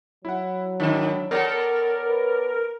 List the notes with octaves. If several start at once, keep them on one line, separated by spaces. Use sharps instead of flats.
F#3 E4 F#5
G#2 D#3 D4 E4 E7
B3 A4 A#4 C#5 D5 A#6
B4